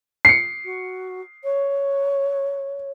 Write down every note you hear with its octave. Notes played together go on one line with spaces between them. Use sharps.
C7 C#7
F#4
C#5